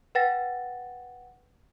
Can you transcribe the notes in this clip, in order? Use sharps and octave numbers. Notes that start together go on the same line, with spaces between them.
B4 F#5 G5 A6 A#6